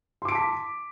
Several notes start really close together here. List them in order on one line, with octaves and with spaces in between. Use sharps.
C6 D6 D7 A5 B6